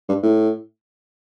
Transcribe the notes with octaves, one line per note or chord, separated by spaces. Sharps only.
G2
A2